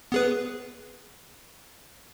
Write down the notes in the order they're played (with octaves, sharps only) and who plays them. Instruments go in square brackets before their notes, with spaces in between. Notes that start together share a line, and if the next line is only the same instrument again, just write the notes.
[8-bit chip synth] B3 G#4 B4